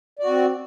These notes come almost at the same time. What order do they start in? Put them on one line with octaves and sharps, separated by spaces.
D5 F#4 C4